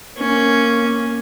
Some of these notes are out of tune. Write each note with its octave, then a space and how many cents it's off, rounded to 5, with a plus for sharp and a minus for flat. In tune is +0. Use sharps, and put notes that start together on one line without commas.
A#3 +0 C#4 +0